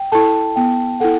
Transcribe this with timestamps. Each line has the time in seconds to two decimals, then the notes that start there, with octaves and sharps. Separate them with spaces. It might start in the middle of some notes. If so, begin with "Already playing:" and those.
Already playing: G5
0.12 E4 A4 A5
0.56 B3 G5
1.00 E4 A4 F#5